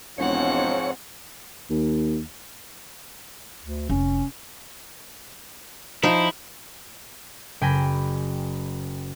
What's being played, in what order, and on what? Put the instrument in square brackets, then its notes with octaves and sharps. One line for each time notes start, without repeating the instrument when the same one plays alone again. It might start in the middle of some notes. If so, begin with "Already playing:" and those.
[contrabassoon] E1 [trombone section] G#2 F3 [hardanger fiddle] C4 F#5 [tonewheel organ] C#5
[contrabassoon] D#2
[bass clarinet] D2
[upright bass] F1 [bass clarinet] C#4
[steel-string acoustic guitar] F3 [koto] D#4 [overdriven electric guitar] E4
[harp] F#1 G5 G#5 B5 G#6 A#6